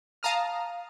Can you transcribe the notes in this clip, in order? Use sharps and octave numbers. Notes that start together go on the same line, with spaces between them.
F5 A5 A#5 D#6 F6